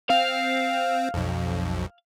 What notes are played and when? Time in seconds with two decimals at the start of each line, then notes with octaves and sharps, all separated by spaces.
0.10 C4 F5
1.14 B1 F2